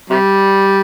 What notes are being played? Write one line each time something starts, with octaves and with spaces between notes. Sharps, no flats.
C3 G3